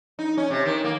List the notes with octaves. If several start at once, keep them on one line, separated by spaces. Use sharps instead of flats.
D#4
C#4
C3
D#3
A#3